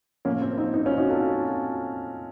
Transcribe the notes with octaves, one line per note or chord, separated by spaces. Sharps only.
A2 F3 A3 A#3 C#4
C4
C4 D#4
C4 D#4
C#4 F4
D#4 F#4
F4 A4